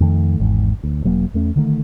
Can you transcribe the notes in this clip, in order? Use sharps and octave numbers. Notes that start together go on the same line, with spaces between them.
F2 D#3 A3
G#1 E2 G#2
D2
E1 F#3 A#3
E2 A3 C#4
D3 D#3 A3